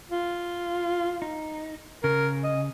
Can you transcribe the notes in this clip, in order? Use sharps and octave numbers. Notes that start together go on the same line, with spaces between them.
F4
D#4
C#3 A#4
D#5